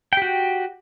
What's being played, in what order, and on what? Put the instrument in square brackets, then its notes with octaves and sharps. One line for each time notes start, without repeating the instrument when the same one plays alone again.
[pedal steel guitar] G5
G4
F#4